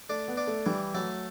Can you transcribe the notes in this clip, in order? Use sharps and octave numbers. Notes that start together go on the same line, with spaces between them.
A3 D4
B3
D4
A3
E3 G3
F#3 A3